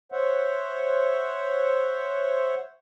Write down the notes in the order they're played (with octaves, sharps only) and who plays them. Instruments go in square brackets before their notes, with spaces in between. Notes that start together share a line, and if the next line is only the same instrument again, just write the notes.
[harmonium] C5 C#5 E5 F#5